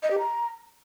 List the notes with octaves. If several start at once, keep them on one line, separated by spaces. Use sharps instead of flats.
D#5
G4
A#5